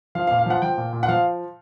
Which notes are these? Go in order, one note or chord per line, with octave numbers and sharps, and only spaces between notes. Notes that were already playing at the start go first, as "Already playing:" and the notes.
F3 F5
F5
A#2
F5
F3 F#5
F3 G5
A#2
A#2
F#5
F3 F5